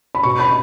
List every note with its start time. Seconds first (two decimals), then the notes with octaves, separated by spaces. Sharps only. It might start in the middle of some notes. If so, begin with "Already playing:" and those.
0.15 B5
0.23 B2 C#6
0.40 B5